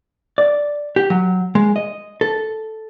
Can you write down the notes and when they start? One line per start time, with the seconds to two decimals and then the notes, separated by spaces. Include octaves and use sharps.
0.38 D5
0.96 G4
1.10 F#3
1.55 G#3
1.76 D#5
2.21 A4